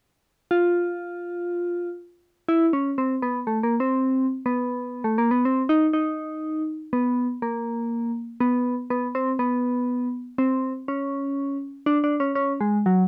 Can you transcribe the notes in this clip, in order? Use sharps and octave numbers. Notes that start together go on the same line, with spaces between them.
F4
E4
C#4
C4
B3
A3
A#3
C4
B3
A3
A#3
B3
C4
D#4
D#4
B3
A#3
B3
B3
C4
B3
C4
C#4
D4
D4
C#4
C#4
G#3
F#3